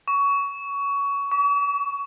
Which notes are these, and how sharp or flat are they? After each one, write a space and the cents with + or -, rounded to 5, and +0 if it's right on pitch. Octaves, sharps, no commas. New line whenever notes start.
C#6 +20
C#6 +45